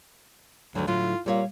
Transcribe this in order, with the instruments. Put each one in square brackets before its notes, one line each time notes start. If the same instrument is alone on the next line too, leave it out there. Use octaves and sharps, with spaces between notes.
[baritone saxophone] D2 [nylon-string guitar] D#3 F#3
[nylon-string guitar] A2 D3 F#3 [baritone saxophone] F4
[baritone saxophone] A#2 [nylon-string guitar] G3 C#5 F5